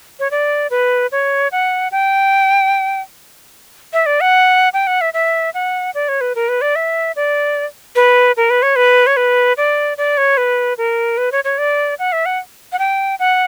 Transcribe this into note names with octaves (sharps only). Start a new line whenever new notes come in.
C#5
D5
B4
C#5
F#5
G5
E5
D5
F#5
G5
F#5
E5
E5
F#5
D5
C#5
B4
A#4
B4
D5
E5
D5
B4
A#4
B4
C#5
B4
C#5
B4
D5
D5
C#5
B4
A#4
B4
C#5
C#5
D5
F#5
E5
F#5
F#5
G5
F#5